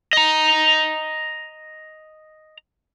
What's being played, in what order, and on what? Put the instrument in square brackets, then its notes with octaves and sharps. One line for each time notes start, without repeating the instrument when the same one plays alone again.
[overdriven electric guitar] D#5 A#5